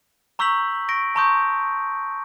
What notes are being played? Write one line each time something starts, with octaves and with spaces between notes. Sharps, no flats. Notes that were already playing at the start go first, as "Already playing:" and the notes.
A#5 C#6 E6 G6 B6 F#7
C#6 A#6 D7
A5 A#5 C6 C#6 D#6 G6